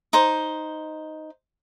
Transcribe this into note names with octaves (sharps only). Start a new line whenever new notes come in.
D#4 C5